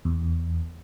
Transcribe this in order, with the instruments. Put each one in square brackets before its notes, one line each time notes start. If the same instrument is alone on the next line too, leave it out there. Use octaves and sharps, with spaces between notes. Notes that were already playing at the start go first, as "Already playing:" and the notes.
[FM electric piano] E2